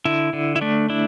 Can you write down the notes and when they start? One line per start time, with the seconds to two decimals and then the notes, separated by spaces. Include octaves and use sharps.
0.05 D3 E4
0.33 D3
0.56 E4
0.61 A3 D4
0.89 D4 E4